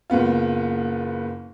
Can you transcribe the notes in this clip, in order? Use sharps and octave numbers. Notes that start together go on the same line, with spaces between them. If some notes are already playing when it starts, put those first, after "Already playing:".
F#1 A#2 B3 F4